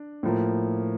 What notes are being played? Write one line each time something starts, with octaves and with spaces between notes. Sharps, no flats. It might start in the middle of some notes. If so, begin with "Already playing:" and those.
Already playing: D4
A2 F3 A#3